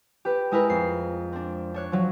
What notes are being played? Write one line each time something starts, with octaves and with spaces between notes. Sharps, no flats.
G4 B4
G#3 E4 A#4 B4
F2 C7
C4 D4
D4 C#5 F#6
F3 F#3